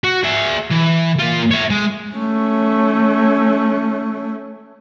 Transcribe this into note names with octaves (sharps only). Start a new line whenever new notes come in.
F#4
G#4 E5
E3
A#3 F4
C#5 E5
G#3
A3 C#4